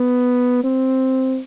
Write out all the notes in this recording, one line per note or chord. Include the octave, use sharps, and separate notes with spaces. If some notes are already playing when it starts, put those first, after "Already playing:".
Already playing: B3
C4